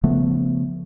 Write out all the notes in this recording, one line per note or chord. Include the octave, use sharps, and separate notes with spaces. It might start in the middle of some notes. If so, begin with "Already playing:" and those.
C#3 F3 A3 B3